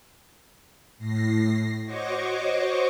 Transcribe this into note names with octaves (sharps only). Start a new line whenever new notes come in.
A2 A#6 C7
F#4 C5 C#5 D#5 C#6 D6